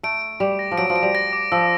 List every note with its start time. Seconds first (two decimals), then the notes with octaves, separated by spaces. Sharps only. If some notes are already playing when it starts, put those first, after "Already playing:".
0.03 A3 D7
0.22 D7
0.40 G3 D6
0.59 A#6
0.72 F3
0.78 F#3 D7
0.90 F3
0.96 D7
1.02 G3
1.15 A#6
1.33 D6
1.52 F3 E6